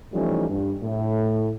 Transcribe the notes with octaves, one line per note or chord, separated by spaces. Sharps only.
E3 F3 G3 A3 C#4 D#4
G2
A2